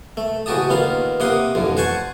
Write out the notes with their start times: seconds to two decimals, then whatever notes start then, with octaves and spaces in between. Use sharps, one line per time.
0.17 A3
0.46 A1 C#3 F#4 G4 A5 D#6
0.70 D#2 B3 F4 A#5
1.20 C3 A#3 F#5 C6 D#6
1.55 A1 F2 D3
1.77 C5 F#5 G#5 A5 C#6